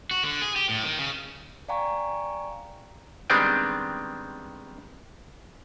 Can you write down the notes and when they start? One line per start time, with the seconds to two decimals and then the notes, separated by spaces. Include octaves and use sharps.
0.11 F#4
0.23 D3
0.42 G#4
0.56 G4
0.69 A2
0.83 D#3
0.98 C#3
1.68 D5 F5 G5 G#5 A#5 C#6
3.30 D#3 G3 G#3 B3 C4 D4